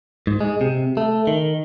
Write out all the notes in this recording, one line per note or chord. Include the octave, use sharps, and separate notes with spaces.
G#2
G#3
C3
A3
D#3